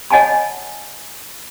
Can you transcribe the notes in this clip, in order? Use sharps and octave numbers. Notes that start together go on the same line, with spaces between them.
C#5 D#5 F#5 G#5 A5 B5